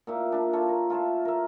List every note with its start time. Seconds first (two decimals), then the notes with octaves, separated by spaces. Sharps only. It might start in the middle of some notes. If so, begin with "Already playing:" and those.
0.07 A#2 D#4 E5 D6
0.32 D4 E5
0.53 F4 A4 C#5
0.69 A#4
0.90 F4 A4 C#5 E5
1.25 A#4 E5